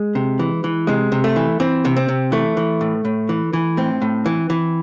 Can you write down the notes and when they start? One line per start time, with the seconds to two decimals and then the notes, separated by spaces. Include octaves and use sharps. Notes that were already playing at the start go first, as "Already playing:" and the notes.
Already playing: G#3
0.15 C3
0.39 E3
0.64 E3
0.87 C3 G#3
1.12 C3
1.24 A3
1.36 E3
1.60 E3 C4
1.85 C3
1.96 C4
2.08 C3
2.32 E3 A3
2.57 E3
2.81 A2
3.05 A2
3.29 E3
3.53 E3
3.77 A2 C4
4.02 A2
4.26 E3
4.50 E3